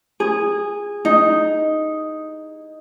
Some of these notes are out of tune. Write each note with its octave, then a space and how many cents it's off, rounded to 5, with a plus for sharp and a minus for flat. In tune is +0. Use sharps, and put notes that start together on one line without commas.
G#4 -15
D#4 +0